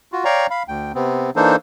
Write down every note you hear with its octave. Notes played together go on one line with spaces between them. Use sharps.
F4 F#4
C#5 D5 F5 G5 A#5 C#6
F5 B5
D2 G5
C3 B3 C4
E3 A#3 D4 D#4 A4 C5